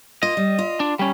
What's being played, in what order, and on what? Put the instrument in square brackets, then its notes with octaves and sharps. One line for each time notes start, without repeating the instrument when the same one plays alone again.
[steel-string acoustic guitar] A#3 F4 [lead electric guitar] D#5
[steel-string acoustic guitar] G3
F4
[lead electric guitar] D4
G3 C#4